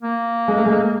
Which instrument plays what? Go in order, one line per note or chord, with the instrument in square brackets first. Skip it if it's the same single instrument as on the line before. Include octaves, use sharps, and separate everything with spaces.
[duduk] A#3
[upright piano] G#3
A3
G#3